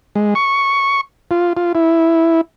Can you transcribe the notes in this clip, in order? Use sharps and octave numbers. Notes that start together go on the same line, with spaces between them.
G#3
C#6
F4
F4
E4